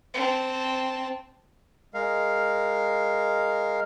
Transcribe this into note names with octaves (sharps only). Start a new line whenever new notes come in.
C4 A5
G#3 A#4 F5